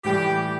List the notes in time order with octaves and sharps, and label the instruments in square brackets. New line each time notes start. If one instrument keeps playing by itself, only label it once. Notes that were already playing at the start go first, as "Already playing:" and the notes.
[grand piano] A2 E3 G3 [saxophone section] G4